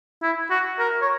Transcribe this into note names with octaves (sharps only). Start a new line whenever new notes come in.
E4
F#4
A#4
C#5